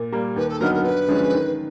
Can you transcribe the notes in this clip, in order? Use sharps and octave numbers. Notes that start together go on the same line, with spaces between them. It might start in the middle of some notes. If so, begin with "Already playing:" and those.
Already playing: A#2
G3 A#3
D#2 B4
A4
D3 F#3 B3 D#4 A#4
A#4
G2 B4
D3 F3 G#3 C#4
D#3